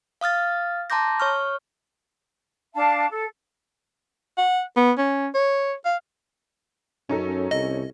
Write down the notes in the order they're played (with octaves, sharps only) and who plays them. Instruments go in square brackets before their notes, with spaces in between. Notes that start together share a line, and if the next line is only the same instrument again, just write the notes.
[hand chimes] F5 D#6 F6 A6
A5 A#5 C6 D6 G6 A#6
C#5 C#6 F6
[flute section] D4 F5 A5
A4
[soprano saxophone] F#5
B3
C#4
C#5
F5
[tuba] F#2 [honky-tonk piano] C#4 D#4 A4
[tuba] C2 [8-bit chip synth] D#5